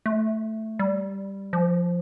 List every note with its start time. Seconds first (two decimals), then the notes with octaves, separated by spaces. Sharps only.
0.06 A3
0.79 G3
1.53 F3